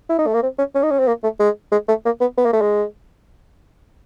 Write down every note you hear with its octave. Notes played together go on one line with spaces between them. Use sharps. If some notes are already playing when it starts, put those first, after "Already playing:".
E4
D#4
A3
A#3
C4
C#4
C#4
D#4
C#4
C4
A#3
A3
G#3
G#3
A3
A#3
B3
B3
A#3
A3
G#3